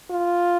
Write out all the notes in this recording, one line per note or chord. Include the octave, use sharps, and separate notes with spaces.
F4